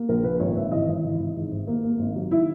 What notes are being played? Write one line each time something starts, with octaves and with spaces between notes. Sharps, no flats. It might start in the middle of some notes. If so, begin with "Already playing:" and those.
Already playing: A#3
A#1 A#4
A#2 B4
G#1 C#5
G#1 E5
E3 D#5
G#1 E4
E3
G#1
G#2
G#1
A#3
A#3
G#1
F#3
D#3 E4